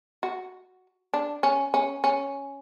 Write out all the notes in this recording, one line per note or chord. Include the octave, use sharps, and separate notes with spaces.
F#4
D4
C#4
C#4
C#4